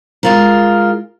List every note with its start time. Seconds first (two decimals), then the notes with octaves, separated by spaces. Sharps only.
0.23 G#3 F4 A#4